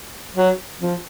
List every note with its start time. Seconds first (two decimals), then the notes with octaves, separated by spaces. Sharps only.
0.36 F#3
0.81 F3